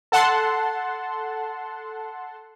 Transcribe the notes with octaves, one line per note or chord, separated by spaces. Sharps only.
A4 F#5 A5 C6